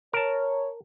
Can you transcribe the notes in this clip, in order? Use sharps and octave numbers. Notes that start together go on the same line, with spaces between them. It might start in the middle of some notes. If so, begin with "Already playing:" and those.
A#4 C#5 A5